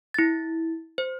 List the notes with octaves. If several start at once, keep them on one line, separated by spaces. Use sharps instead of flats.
E4 A6
C5